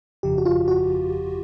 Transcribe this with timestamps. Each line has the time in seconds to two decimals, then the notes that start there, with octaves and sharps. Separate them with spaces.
0.23 G1 F2 C#3 F3 G4
0.38 F#4
0.45 F4
0.68 F#4